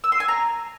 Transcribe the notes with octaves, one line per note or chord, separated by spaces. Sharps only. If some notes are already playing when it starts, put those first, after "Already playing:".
E6
C6
G#5
A#5